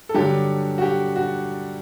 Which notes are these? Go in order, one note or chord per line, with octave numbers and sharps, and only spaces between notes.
A4
G2 D3 F#3 G4
F#4
G4
F#4